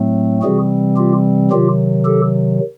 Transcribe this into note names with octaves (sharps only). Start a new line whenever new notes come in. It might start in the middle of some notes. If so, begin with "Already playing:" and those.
Already playing: A2 F#3 A3 C4
C3 E3 G3 C4 F#4 G#4
F4 G4
C3 D#3 F#3 F4 G4
G4 A4